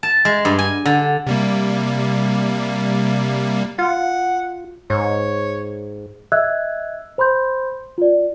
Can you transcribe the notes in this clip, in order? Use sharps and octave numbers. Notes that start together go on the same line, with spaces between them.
A5
G#3
G2
G#5
D3
C3 G3 A#3
F4 F#5
G#2 C#5
D#5 E5 E6 F#6 G#6
C5 B5 C6 G6
F4 D5